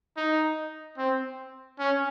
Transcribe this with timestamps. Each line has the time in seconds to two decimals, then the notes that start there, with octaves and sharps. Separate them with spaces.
0.17 D#4
0.98 C4
1.79 C#4